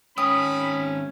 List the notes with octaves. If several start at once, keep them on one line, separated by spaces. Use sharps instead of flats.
D#3 G#3 C#4 G5 B5 D#6